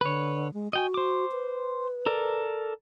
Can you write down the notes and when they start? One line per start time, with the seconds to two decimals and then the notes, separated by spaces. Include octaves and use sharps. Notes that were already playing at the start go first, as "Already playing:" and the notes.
0.01 D3 B4 C#5
0.54 G#3
0.73 F#4 D#5 G5 G#5
0.94 C5 D6
1.32 B4
2.06 A4 A#4 D5